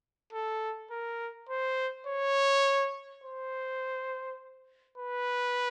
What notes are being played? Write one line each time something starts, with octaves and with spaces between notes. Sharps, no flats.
A4
A#4
C5
C#5
C5
B4